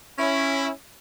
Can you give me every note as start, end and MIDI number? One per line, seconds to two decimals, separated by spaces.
0.18 0.69 61
0.18 0.69 64